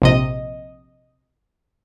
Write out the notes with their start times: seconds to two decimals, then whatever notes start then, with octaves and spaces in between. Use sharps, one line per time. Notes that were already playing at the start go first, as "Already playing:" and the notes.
0.02 A#1 C3 D#5